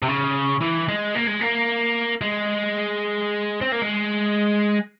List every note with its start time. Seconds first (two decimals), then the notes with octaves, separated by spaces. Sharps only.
0.02 C3
0.08 C#3
0.61 E3
0.88 G#3
1.15 A#3
1.27 G#3
1.41 A#3
2.21 G#3
3.61 C4
3.72 A#3
3.82 G#3